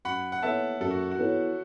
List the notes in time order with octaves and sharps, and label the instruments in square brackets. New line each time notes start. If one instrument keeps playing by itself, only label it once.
[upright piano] F#2 [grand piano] F#5 B5
[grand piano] F#5
[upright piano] E3 B3 A4 C#5 [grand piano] E5 A5
[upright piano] F#2 [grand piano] A4
[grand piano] F#4
F#4
[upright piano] E3 B3 A4 C#5